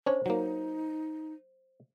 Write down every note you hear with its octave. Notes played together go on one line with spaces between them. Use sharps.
C#4 D4 C5 C#5
F#3 A#3 D#4